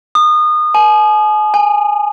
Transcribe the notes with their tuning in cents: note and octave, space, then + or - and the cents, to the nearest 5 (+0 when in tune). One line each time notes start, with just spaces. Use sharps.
D#6 -25
G#5 +40
G#5 -15